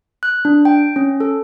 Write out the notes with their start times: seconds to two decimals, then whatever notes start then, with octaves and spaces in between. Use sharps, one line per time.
0.23 F#6
0.45 D4
0.65 G5
0.96 C#4
1.20 A4